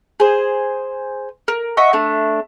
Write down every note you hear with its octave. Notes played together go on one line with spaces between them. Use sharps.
G#4 C5
A#4
D#5 E5 F#5 C#6
A3 D4